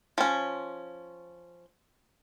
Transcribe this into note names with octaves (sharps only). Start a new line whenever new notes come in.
F3 C#4